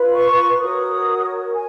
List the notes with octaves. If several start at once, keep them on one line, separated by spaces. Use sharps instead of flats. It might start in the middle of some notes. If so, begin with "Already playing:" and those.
Already playing: F4 B4
C#6
F#4 A#4 C#5 D#6
G#5